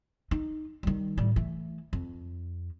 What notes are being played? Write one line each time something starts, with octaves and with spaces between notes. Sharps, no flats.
D#4
D#3 G3
A2 G3
E3 A3
F2